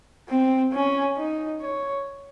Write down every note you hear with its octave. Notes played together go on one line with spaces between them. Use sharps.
C4
C#4
D#4
C#5